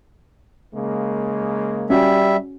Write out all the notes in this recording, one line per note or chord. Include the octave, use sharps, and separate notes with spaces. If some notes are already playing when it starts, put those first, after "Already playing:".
C#3 G#3 A#3
G3 C#4 F#4 E5